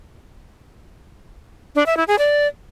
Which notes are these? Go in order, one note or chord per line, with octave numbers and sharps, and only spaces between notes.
D4
E5
E4
G#4
D5